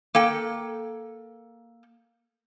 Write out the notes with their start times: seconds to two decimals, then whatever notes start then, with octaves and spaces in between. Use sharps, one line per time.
0.15 A#3 A4 G5